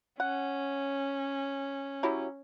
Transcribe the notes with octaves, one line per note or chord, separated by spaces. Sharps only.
C#4 F#5
F#3 E4 G4